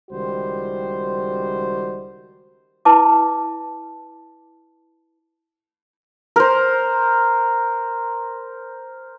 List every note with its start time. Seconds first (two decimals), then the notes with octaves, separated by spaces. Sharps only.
0.10 C#2 D#3 G3 F#4 C5
2.85 E4 B4 A5 D6
6.36 A#4 C5